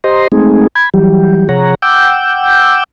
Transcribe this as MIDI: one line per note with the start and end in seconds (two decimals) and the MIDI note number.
0.04 0.28 67
0.04 0.28 72
0.04 0.28 75
0.04 0.28 82
0.04 0.28 84
0.32 0.67 56
0.32 0.67 57
0.32 0.67 60
0.32 0.67 63
0.32 0.67 68
0.75 0.89 83
0.75 0.89 92
0.94 1.48 52
0.94 1.48 54
0.94 1.48 55
0.94 1.48 67
1.49 1.75 48
1.49 1.75 53
1.49 1.75 68
1.49 1.75 73
1.49 1.75 78
1.49 1.75 82
1.82 2.84 78
1.82 2.84 79
1.82 2.84 86
1.82 2.84 88
1.82 2.84 91